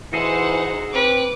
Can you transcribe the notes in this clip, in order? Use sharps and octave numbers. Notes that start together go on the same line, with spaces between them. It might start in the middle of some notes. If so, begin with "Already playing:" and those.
E3 D#4 F#4 G#4 A4 C5 F#5
C4 B4 D6